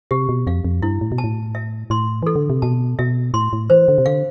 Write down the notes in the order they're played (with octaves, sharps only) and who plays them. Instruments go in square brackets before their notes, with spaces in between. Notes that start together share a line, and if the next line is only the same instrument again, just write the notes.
[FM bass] C3 [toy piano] G4
[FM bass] B2
[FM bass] F2 [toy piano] F5
[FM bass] F2
[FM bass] G2 [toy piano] E4
[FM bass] A2
B2
[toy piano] A5
[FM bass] A2
[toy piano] E5
[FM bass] A2 [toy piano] C6
[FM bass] E3 [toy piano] A4
[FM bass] D3
C3
[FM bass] B2 [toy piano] A5
[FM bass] B2 [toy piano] E5
[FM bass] A2 [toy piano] C6
[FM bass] A2
[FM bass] E3 [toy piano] C5
[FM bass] D3
C3
[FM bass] D3 [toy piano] F5